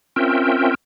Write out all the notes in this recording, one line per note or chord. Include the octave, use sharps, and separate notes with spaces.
C4 C#4 F4 A#4 E5 G5